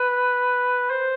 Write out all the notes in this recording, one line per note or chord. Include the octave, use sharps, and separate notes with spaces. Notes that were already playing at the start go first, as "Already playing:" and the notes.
Already playing: B4
C5